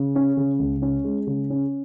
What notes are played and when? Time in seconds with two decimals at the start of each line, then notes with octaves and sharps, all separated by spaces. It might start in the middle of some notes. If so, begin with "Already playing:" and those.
Already playing: C#3
0.15 C#4
0.37 C#3
0.59 C#2
0.82 C#4
1.04 G#3
1.27 C#3
1.50 C#4